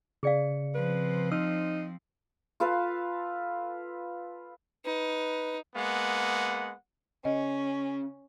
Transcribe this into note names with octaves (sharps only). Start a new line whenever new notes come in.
C#3 G#4 D5 F5 C#7
F3 C4 B4
D#4 E6 F6
F4 A4 B4 F5
D#4 B4
G#3 A#3 B3 F#5
C#3 C#4 D#5